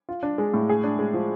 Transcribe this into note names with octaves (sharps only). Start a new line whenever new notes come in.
F4
D4
G#3
A2
G#4
D4
G#3
F3